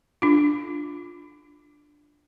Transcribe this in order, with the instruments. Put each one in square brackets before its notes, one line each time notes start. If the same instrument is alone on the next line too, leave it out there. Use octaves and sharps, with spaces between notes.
[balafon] D4 F4